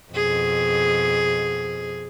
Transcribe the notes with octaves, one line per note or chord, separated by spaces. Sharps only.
F2 B2 G#4